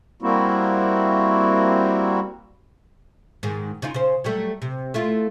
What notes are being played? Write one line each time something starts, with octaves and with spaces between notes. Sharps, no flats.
G3 A#3 C4 E4 F#4
G#2 D#3 G#4
C#3 D#4 F4
C#3 C5
F#3 G3 A3
C3
A3 E4 F4